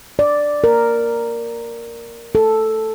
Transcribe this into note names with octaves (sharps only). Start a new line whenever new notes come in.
D5
A#4
A4